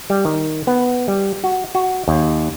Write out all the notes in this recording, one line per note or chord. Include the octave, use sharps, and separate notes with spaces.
G3
D#3
B3
G3
F#4
F#4
D#2